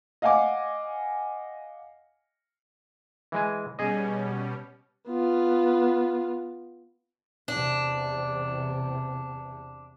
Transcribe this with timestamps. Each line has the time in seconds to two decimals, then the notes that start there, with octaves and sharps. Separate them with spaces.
0.22 D#5 F5 F#5 G#5 D6
3.32 E3 G#3 G#5
3.79 B2 G3 C#4 G#4 D#5
5.08 B3 F4
7.48 E2 C3 D4